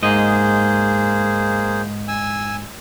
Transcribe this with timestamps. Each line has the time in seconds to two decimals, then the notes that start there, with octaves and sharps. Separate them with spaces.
0.03 G#2 A#3 G#4 C5 D#5
2.08 G#5 E6